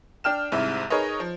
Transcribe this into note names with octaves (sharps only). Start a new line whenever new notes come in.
D4 G5 F6 E7
C2 G#2 C3 E4 E5
D#4 G#4 A#4 B4 C#5 D#5
F3